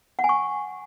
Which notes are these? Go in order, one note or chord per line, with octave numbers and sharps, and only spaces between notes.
F#5
G#5
C#6